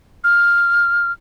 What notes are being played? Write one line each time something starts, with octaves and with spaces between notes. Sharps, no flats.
F6